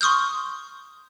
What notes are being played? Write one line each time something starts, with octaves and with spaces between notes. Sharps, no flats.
C6 C#6 D#6 F6 G6